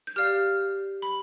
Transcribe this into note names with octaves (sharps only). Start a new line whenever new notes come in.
G6
G4 D5 F5 F6
B5